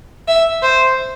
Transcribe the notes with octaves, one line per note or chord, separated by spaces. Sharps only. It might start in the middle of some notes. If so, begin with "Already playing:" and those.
E5
C5